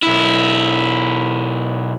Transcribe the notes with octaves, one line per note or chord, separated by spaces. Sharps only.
B1 E4